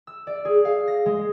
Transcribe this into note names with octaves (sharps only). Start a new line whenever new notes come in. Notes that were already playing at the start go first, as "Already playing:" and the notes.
E6
D5
G#4
F5
A#6
G#3